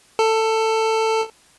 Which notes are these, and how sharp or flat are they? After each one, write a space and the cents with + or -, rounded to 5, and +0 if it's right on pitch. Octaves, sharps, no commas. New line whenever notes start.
A4 +15